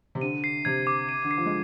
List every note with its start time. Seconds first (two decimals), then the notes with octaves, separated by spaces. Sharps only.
0.15 C3
0.21 D3 D#7
0.44 C7
0.65 C3 G#6
0.87 D6
1.09 D#7
1.24 D3
1.31 C7
1.38 F3
1.46 G#3